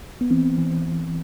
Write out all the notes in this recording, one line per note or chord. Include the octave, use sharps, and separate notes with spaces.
B3
E3 C4
E3